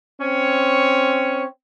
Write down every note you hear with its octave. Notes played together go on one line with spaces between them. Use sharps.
C4 C#4 C#5